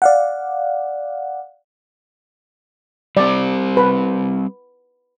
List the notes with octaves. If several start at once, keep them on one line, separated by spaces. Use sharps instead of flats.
D5 F5 F#5
G3 C4 D5
B4